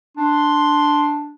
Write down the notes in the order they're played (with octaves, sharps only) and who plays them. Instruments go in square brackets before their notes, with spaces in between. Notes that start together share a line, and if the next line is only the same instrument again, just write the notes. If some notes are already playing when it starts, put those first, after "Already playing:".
[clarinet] D4 [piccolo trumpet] C6